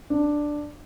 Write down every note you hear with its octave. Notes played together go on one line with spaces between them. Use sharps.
D4